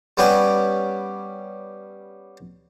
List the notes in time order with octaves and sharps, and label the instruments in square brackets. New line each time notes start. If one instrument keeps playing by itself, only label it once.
[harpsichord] G3 B3 C#4 G4 B4